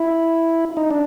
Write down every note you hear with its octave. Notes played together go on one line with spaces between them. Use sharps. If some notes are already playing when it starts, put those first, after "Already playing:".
Already playing: E4
D#4
D4